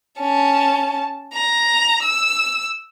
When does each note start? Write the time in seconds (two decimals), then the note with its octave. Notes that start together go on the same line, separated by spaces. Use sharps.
0.20 C#4 A5
1.34 A#5
2.03 E6